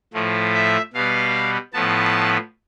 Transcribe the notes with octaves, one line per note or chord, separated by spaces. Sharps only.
A2 F3 A3
E5
B2 G3 B3 F5
A2 F3 B3 A5